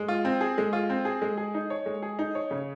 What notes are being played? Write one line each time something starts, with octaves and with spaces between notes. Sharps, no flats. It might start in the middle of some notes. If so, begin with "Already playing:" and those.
Already playing: G#3
F4
C4
G#4
G#3
F4
C4
G#4
G#3
G#4
D#4
C#5
G#3
G#4
D#4
C#5
C#3